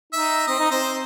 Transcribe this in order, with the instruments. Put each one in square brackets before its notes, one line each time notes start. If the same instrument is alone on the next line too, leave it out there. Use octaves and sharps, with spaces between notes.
[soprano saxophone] D#4 [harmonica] E5
[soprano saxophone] C4 [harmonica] D#5
[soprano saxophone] D#4
[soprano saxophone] C4 [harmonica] C5